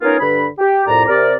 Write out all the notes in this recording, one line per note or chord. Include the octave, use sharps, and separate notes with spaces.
B3 C#4 D#4 F4 G#4 A#4
G2 D3 B4 B5
G4
C2 F2 A2 D5 A#5
C3 A#4 D5